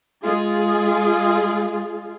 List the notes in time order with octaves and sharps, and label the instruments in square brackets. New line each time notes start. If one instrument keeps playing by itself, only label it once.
[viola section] G#3 F4 G#4